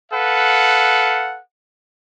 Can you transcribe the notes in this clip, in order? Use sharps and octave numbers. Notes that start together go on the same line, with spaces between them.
A4 B4 F5 F#5